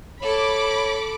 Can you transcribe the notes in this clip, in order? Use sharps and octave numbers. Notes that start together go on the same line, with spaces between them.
A4 C#5 B5 D6